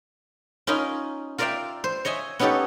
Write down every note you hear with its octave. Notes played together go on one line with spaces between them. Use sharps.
C#4 D#4 F4 A#4 D#5 B5
F4 A#4 D5 E5 F5 G5
C5
C#5 D#5 E5 G#5
B3 C#4 D#4 G4 A4 C#5